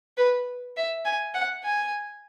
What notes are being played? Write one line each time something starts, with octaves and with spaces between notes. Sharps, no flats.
B4
E5
G#5
F#5
G#5